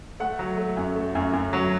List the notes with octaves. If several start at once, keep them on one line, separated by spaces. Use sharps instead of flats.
A3 F#5
F#3
A3
F#2
A3
F#2
F#2
F#3